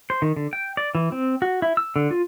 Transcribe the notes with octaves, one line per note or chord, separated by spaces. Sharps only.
C5
D#3
D3
G5
D5
E3
C4
F#4
E4
E6
D3
F4